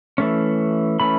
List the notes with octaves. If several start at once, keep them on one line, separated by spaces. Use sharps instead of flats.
E3 A3 C#4
E3 A3 C#4 B5